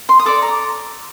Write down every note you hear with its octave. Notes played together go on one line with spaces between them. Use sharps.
C6
D#6
A4 D5 D6
A#5